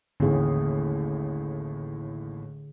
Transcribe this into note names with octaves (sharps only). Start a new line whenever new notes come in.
A1 D#2 A2 D3 G#4